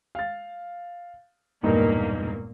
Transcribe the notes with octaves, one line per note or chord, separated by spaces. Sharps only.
F5 A6
E1 G2 A#2 A#3 D#4